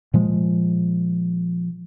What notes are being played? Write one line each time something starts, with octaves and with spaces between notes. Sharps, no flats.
A#2 F3 G#3